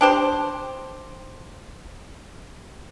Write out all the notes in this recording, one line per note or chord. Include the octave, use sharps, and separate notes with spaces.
D4 G4 C5